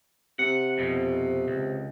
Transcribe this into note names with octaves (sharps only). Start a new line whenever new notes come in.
C3 F#5
F2 B2
C#2